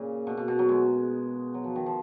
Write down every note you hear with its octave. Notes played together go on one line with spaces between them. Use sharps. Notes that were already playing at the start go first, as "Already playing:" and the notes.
Already playing: A#2 C#3
B2
B2
B2
F#3
G#3
F#3
F3
D#3
F3